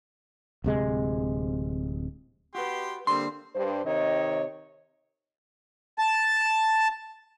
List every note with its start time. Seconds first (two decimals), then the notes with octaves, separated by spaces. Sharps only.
0.64 D1 C3 G#3
2.55 F#4 G4 B4 C6
3.07 D3 G3 A#3 C4 C6
3.54 G2 C5
3.85 C3 D#3 C#5 D#5
5.98 A5